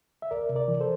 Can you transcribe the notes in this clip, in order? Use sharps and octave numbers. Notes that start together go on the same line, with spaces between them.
E5
D2 A#4 D5
C3
A#4 D5
E3
A4 C5